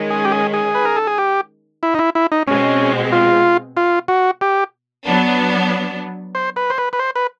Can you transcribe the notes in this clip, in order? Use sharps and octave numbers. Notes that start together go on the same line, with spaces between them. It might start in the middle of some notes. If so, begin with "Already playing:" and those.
Already playing: D#3 G#3 C#4
G#4
G4
G#4
G#4
B4
A#4
A4
G#4
G4
E4
D#4
E4
E4
D#4
B2 G#3 C4 C#4
F4
F4
F#4
G4
F#3 B3 D4
C5
B4
C5
B4
B4
C5
B4